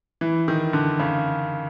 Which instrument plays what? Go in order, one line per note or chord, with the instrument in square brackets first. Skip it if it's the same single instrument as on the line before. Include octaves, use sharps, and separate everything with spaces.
[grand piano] E3
D#3
D3
C#3